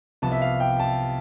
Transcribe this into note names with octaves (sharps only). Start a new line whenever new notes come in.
C2 C3 F3 B3 A5
E5
F5
G5
A5